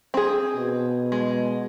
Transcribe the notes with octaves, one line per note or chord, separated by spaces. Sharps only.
C4 G#4
B2
G#3